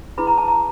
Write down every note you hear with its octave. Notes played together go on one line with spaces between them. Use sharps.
E4 G#4 B4 B5
A#5
A5
A#5